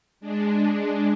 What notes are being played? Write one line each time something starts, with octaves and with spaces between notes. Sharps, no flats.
G#3 D4